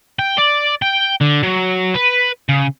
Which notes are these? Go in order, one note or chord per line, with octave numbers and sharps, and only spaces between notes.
G5
D5
G5
D3
F#3
B4
C#3